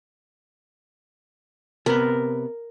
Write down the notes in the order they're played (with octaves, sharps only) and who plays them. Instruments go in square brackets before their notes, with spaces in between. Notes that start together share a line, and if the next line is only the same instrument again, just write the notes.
[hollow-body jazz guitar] C3 B3 [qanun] A#4